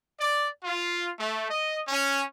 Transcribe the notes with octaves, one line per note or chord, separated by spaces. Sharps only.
D5
F4
A3
D#5
C#4